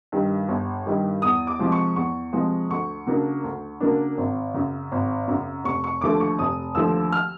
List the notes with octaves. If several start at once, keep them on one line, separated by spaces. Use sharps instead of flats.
G2 D#3 G3
G1
G2 D#3 G3
E2 D#6
D6
C3 F3 G#3
C#6
E2 C#6
C3 F3 G#3
D2 C#6
C#3 F#3 A#3 D4
D2
C#3 F#3 A#3 D4
G#1
F#2 C#3
G#1
F#2 C#3
F1 C#6
C#6
D#2 D3 F3 A3 D6
C#6
F1 D#6
D#2 D3 F3 A3 E6
F6